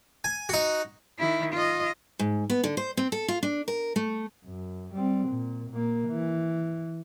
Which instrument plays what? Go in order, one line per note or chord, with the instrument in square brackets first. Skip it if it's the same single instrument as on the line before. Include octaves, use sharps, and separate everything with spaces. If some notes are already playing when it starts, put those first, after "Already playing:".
[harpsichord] G#5
D#4 F#4
[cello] D#3 E4
F4 D#5
[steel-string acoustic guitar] G#2
B3
D3
C5
C4
A4
F4
D4
A#4
A3
[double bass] F#2
G3 C4
A#2
A#2 A#3
E3